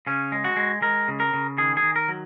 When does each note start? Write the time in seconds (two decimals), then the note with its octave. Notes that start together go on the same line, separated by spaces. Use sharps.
0.07 C#3 C#4
0.32 G#3
0.44 F#4
0.56 G#3
0.82 G#3 A#4
1.08 C#3
1.20 A#4
1.34 C#3
1.58 D#3 G#4
1.77 G#4
1.83 D#3
1.96 A#4
2.08 F#3